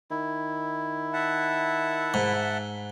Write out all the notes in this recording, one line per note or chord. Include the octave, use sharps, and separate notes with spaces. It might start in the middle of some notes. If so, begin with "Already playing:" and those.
D#3 E4
E5 F#5 A5
G#2